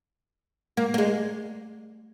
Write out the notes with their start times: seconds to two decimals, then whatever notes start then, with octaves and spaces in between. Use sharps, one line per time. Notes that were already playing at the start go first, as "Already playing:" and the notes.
0.77 A#3
0.94 A#3
0.98 G#3